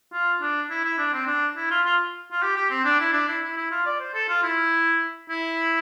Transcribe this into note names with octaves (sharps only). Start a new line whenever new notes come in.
F4
D4
E4
E4
D4
C4
D4
E4
F4
F4
F4
G4
G4
C4
D4
E4
D4
E4
E4
E4
F4
D5
C5
A4
F4
E4
E4